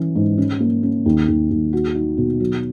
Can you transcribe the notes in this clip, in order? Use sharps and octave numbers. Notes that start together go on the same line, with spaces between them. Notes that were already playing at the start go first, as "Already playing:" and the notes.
Already playing: E3 C#4
G#2
C#4
A#3
C#4
D#2
D#2
D#2
F#4
D#4
B2
F#3